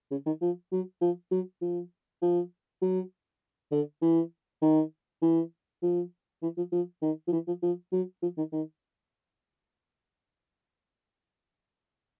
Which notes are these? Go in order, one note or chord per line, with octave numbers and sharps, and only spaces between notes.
C#3
D#3
F3
F#3
F3
F#3
F3
F3
F#3
D3
E3
D#3
E3
F3
E3
F3
F3
D#3
F3
E3
F3
F3
F#3
F3
D#3
D#3